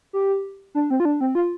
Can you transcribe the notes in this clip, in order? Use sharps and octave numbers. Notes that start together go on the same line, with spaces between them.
G4
D4
C4
F4
D4
C4
F4